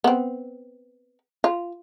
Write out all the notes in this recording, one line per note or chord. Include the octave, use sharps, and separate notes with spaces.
B3 C4
F4